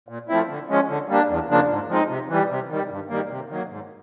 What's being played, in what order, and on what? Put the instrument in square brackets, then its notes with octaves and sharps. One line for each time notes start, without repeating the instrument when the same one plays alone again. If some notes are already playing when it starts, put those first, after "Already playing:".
[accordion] A#2
F3 A3 C4 E4
D3
F3 G#3 C#4
D3
G3 A#3 D4
E2
C#3 F3 A#3 D4
G#2
F3 G#3 C4 D#4
C3
E3 G3
C3
D#3 G3
G2
D#3 G3 A#3
C3
D#3 F#3 A#3
G#2